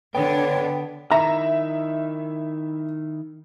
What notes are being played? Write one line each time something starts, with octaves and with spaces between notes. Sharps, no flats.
D3 B3 D4 C#5 G5
D#3 E4 E5 A#5